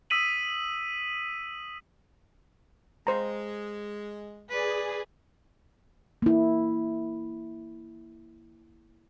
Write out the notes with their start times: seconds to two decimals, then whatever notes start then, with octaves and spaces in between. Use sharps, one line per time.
0.10 D#6 E6 B6 D#7 F#7
3.07 G#3 C5 A#5
4.49 G#4 B4 D5
6.22 A#3 E4